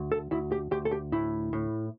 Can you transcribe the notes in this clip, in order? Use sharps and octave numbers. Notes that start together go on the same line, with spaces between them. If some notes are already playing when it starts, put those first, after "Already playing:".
Already playing: D2
A4
D2 E4
G4
D2 G4
A4
G4
A2 E4
A2